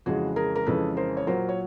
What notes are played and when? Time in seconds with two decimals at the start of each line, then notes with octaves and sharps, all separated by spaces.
0.06 F2 C#3 E3 G#3 F#4 G#4
0.36 G#4 A#4
0.56 A#4
0.66 F2 C#3 E3 G#3 A4 B4
0.97 A#4 C5
1.17 C#5
1.27 A#2 F#3 A#4 C5
1.49 C#5